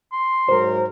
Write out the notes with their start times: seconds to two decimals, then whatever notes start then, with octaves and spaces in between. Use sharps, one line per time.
0.13 C6
0.49 G#2 F#3 A#4 C5